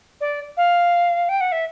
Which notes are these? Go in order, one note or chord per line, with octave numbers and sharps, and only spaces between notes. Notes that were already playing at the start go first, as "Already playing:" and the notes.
D5
F5
G5
F#5
E5